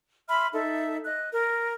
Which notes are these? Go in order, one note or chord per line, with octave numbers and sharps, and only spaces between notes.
E5 B5 C6 F6
D#4 A4 E5
D#5 F#6
A#4